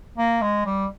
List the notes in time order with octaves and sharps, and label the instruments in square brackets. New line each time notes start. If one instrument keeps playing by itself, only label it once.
[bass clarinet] A#3
G#3
G3